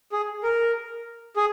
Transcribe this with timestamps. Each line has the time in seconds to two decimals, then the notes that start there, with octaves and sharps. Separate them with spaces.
0.12 G#4
0.43 A#4
1.36 G#4